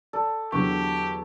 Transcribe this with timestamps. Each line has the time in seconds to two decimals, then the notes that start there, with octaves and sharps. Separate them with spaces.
0.13 A4 D5
0.52 E2 D3 F#3 G4 C#6